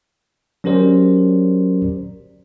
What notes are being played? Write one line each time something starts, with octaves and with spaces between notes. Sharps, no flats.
F#3 C#4 G4 A#4 C5 D5